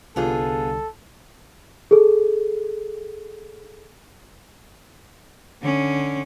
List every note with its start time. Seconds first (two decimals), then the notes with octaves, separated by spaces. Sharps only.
0.16 C2 D3 G3 B3 F4 G#4 A4
1.91 G#4 A4
5.62 D3 C#4